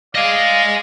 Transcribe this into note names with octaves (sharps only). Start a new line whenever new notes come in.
D5 D#5 F5 G#5